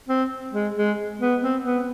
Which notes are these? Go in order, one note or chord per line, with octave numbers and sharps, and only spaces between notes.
C4
G#3
G#3
B3
C4
B3